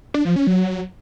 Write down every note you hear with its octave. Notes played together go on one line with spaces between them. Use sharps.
D4
F3
C#4
F#3